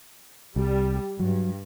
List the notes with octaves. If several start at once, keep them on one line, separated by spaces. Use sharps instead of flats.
C2 G3
G2 F#3